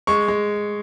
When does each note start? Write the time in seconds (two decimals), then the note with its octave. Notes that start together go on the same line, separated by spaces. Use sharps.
0.07 G#3 C#6
0.28 G#3